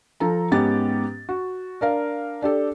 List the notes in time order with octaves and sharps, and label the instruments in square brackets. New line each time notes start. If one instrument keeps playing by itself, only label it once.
[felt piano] F3 A4 A#5
G#2 B3 C#4 G4 A6
F#4
D4 A#4 F5
D4 G4 A4